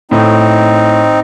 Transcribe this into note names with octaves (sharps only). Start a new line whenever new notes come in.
A2 C4 D#4